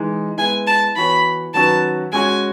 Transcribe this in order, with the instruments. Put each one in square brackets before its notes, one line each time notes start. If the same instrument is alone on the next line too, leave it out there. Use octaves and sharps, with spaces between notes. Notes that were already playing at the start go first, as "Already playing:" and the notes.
Already playing: [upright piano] E3 G#3 D#4
[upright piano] G#3 B3 E4 B4 [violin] G#5
[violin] A5
[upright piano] E3 B3 F#4 C#5 [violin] B5
[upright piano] D#3 F#3 C#4 F#4 B4 [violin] A5
[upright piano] G#3 C#4 F#4 [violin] G#5